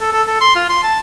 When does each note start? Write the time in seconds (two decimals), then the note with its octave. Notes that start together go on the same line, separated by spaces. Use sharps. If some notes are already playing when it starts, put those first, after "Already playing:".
0.01 A4
0.13 A4
0.27 A4
0.41 C6
0.56 F4
0.69 C6
0.83 A5